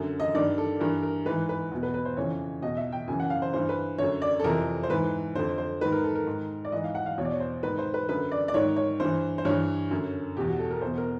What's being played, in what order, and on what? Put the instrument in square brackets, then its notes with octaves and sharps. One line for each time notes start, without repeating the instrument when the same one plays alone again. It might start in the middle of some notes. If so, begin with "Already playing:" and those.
Already playing: [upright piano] F#2 D3
D#5
G2 D#3 D5
A4
G2 E3 A#4
A#4
G#2 E3 B4
B4
E2 B2
B4
B4
C5
F2 C#3 E3 C#5
E2 B2 D#5
E5
G5
F#2 C#3 E3 G#5
F#5
F5
C5
G2 E3 C5
B4
F#2 D3 C#5
D5
A4
F2 C3 E3 A#4
C5
G#2 E3 B4
F2 D3 C5
C5
G#2 D#3 B4
A#4
A4
A#4
G#2 D#3
D5
G#2 E3 D#5
F5
F#5
F5
E2 B2 C#5
D5
C#5
C5
G#2 D#3 B4
C5
B4
F#2 D3 B4
D5
D5
G#2 D#3 C#5
C#5
G2 E3 C5
C5
G2 E3 C#5
F#2 D3
E2 B2 G4
F#4
A4
A#4
E2 B2 C5
A#4